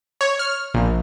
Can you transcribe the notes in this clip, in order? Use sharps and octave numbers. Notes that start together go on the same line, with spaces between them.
C#5
F6
A#1